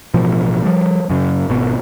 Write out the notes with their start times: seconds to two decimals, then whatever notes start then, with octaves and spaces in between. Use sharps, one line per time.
0.14 A1 B2 F3
0.64 F3 G3
1.09 F#2 C#3
1.49 G#1 B2